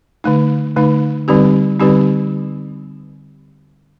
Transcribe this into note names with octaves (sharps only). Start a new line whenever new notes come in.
D3 A3 D#4
D3 A3 D#4
D3 G3 C4 D#4 G4
D3 G3 C4 D#4 G4